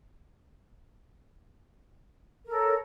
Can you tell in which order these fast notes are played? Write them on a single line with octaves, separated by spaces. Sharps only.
A#4 A4 C#5